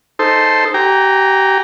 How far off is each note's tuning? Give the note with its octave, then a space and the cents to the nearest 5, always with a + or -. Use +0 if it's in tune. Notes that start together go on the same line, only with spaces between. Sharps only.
D#4 -10 A4 +0 C5 +0
G4 -35 G5 +40 A#5 +0